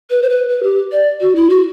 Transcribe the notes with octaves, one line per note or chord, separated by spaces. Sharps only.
B4
C5
B4
B4
G4
D5
F#4
E4
F#4